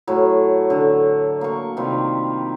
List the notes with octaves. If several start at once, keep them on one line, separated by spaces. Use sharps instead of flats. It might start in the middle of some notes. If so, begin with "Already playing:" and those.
A2 F#3
D3
A#3 C#6
C3 D#3 G3 F4